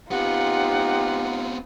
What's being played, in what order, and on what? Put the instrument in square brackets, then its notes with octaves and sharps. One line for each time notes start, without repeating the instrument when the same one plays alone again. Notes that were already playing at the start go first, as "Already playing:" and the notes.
[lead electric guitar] B3 C4 [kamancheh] D#4 F4 [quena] G4 [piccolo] F#5